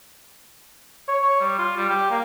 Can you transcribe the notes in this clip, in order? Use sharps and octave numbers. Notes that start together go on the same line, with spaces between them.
C#5
C#5
G3
F4
G3
G4
A#3